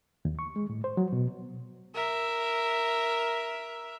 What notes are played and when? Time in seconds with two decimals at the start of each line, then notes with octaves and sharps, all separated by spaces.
0.25 D#2
0.39 C#6
0.56 G#3
0.70 A2
0.84 C5
0.97 F#3
1.13 B2
1.95 A#4 E5